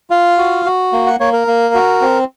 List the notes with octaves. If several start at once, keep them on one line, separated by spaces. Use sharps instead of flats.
F4 F5
F#4
F#4
A#3
F#5
A#3 C#5
A#4
A#3
F#4
C4